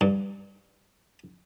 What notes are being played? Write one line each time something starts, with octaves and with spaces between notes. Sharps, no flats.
G2